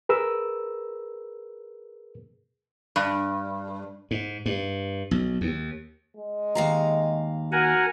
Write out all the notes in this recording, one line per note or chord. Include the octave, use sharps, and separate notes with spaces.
G#4 A#4 B4 E6
G2
G#2
G2
B1
D#2
G#3
D#2 F5 A#5
F#4 A#4 F#5 G#5